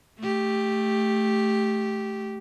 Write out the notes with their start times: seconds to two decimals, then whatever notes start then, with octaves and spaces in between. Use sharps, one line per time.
0.19 A3 G4